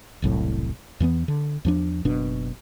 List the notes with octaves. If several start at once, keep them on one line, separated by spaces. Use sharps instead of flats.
E1 C2 A2 F#3
E2 E3 A#3 B3
D3
E2 F3 D4
F#1 B2 D4